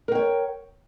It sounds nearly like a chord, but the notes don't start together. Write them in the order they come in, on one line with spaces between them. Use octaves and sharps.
A#4 G5 C#5